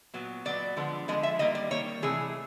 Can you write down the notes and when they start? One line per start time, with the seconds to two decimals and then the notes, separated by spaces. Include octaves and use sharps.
0.14 A#2 F#3 B3
0.45 A#2 F#3 B3 D5
0.76 D3 F3 G#3 B3
1.08 D3 F3 G#3 B3 D#5
1.23 E5
1.39 D#3 G3 A#3 D#5
1.55 D5
1.71 D#3 G3 A#3 C#5
2.02 C3 E3 A3 G#4